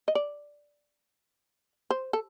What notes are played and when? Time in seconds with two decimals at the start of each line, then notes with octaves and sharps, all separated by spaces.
0.08 D#5
0.15 D5
1.90 C5
2.13 A4